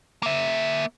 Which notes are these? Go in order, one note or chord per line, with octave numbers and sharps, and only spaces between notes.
A#3 E5